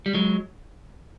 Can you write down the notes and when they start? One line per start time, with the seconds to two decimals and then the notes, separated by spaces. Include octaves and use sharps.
0.06 G3
0.15 F#3 G#3